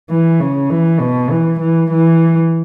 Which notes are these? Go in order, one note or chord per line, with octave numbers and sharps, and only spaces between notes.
E3
C#3
E3
B2
E3
E3
E3